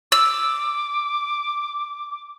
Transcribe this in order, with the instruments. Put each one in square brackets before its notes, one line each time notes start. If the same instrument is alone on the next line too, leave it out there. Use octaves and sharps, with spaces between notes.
[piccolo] D6 [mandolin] E6